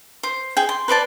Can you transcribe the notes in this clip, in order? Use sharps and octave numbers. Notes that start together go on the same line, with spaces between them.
C5
G#4 G5
C6
B4 C5 D5 A5